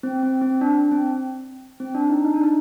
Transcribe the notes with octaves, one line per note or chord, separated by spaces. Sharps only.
C4
C4
C4
D4
C4
C4
D4
D#4
D#4
D4
D#4